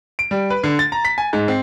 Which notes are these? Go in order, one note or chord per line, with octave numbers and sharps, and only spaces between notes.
D7
G3
B4
D3
A6
A#5
B6
G#5
G#2
C4